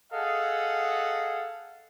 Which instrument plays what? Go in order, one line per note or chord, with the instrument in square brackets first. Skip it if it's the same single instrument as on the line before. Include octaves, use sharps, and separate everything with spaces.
[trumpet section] G#4 A4 D#5 F5 F#5